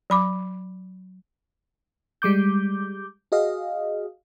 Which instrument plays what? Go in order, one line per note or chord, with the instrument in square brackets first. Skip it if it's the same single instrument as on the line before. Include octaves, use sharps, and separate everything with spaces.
[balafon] F#3 B5 D6
[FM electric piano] G3 G#3 D6 G6
F#4 G#4 D#5 F5